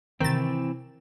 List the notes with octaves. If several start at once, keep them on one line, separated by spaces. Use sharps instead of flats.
C3 D#3 E3 C4 E4 A6